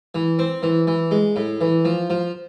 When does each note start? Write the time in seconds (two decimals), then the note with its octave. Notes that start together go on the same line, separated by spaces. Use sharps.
0.15 E3
0.39 C4
0.63 E3
0.87 E3
1.11 G#3
1.36 A2
1.61 E3
1.85 F3
2.10 F3